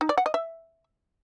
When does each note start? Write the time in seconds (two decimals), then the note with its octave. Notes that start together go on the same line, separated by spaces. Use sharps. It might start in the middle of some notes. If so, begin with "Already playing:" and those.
0.01 D#4
0.09 D5
0.18 F#5
0.26 D#5
0.34 E5